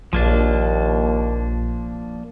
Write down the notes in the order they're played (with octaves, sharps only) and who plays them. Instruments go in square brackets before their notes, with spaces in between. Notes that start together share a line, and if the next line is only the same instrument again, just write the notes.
[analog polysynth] A#1 [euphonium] D#2 [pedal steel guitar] F3 A#3 D4